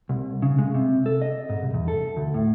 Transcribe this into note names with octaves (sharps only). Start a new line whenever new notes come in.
C2
C#3
G#3
C3
A4
D#5
G#2
C2
E2
A4
D2
A2